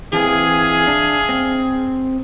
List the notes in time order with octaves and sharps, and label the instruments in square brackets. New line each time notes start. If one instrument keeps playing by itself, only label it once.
[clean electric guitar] E3 C4 [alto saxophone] G#4 [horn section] E5 F5 G#5
[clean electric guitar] D4
C4